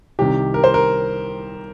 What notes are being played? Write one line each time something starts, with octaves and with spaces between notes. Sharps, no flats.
C2 C3 D#3 G4
A#4
C5
A#4